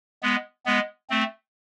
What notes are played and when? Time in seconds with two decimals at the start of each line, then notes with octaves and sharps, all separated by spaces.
0.23 G#3 B3
0.66 G#3 B3
1.10 A3 C4